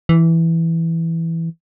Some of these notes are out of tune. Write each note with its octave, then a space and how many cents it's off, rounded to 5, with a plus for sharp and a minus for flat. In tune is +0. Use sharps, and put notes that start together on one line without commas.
E3 +0